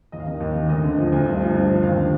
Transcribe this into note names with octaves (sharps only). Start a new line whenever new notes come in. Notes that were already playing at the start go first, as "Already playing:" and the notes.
D#2 D#5
F5
D#3 D#5
D#2
D#3
D2 D#5
D3
F3
D2
G2
F3
G2
F3
D#2 F5
D3